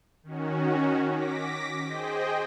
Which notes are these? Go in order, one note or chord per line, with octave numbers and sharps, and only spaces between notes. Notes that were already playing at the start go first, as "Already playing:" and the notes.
D#3 C#4 F#4
D6 A#6 B6
G#4 C5 D#5 G5